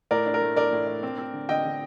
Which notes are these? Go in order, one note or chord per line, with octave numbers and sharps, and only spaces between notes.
A2 A#4 D5
D4
A#4
A3
D4 A#4 D5
A2
D4
C4
C4
D3
D3 D#5 G5
D3